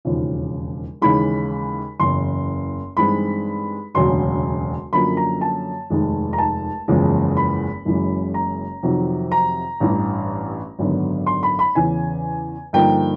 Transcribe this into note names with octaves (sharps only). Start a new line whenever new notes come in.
E1 D#2 C#3 F3
D#2 C#3 E3 G#3 B5
F#1 E2 C#3 C6
G2 E3 G#3 C4 D#4 B5
E1 D2 C#3 F#3 C6
F#2 D3 F3 A#3 C#4 B5
A#5
A5
F1 D#2 D#3 G#3
A#5
A5
F#1 E2 C#3 F3 G#3
B5
F#1 F#2 C#3 E3 G#3
A#5
F2 C3 D#3 F#3
A#5
A1 G2 E3
G#1 F#2 D3 F#3 B3
C6
B5
B5
E2 C#3 E3 G#5
G2 D3 F3 A#3 D#4 G5